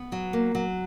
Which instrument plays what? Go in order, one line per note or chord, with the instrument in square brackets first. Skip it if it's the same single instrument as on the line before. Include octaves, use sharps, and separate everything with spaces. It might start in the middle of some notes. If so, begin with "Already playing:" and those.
Already playing: [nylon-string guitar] B3
F#3
A#3
F#3